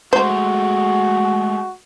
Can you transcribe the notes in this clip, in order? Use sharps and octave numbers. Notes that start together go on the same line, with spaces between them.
G#3 A3 F#4 C5